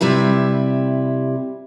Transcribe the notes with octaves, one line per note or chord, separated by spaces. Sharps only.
C3 G3 E4 B4